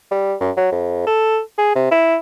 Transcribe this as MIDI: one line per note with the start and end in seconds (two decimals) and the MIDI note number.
0.11 0.35 55
0.40 0.51 42
0.57 0.68 54
0.72 1.06 41
1.07 1.39 69
1.58 1.74 68
1.75 1.89 48
1.91 2.17 64